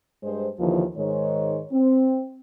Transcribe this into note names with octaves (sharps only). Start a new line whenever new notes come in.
G2 G#3 C5
D#2 D3 E3 F3
G#2 D#3 G#3 C#5
C4